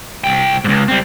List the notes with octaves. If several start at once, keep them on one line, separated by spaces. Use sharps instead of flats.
C2 G5
C#2 G#2
G3 C4